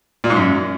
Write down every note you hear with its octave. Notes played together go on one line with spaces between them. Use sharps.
A#2
G#2
F#2